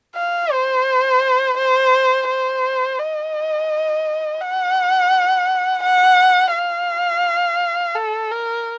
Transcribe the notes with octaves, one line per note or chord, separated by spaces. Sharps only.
F5
C5
C5
C5
D#5
F#5
F#5
F5
A4
A#4